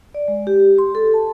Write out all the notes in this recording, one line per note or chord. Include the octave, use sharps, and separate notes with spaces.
D5
G#3
G4
C6
A4
A5